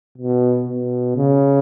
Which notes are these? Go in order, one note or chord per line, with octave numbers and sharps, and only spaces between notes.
B2
B2
C#3